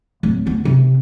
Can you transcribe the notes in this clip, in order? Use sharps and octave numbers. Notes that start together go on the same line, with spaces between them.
D1
D2 B3
C3 C4